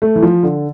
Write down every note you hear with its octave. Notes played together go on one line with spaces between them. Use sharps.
A3
E3
F3
D3